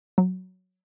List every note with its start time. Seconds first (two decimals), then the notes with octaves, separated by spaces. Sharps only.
0.18 F#3